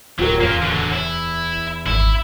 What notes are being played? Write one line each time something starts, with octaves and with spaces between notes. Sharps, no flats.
D1 F#3 F4 G4 A#4
E2 A#3 F4
D3 F#3
E4
G#1 E4